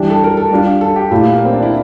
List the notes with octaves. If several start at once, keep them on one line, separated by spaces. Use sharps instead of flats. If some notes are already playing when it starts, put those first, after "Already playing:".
Already playing: E3 G3 D4
A4
A#4
A4
G3 D4 F4
A4
G4
A#2 A3 E4 F4 G4
A#3
C4
D4
E4